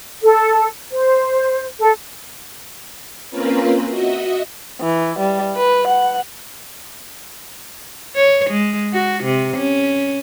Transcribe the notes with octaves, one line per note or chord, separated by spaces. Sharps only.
A4
C5
A4
A#3 C4 C#4 F4 A#4 B4
F#4 D#5 E5
E3
G3
B4
F#5
C#5
G#3
F#4
C3
C#4